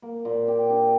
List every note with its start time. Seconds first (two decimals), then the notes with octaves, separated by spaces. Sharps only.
0.02 A#3
0.25 A#2
0.48 G4
0.70 D4